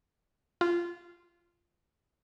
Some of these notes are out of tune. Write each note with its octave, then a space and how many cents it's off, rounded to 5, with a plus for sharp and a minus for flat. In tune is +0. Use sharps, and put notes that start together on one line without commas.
F4 -15